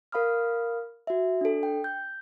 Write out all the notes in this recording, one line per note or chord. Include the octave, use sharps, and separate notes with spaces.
A#4 F5 B5 D#6 F6
F#4 E5
D4 A4
G5
G6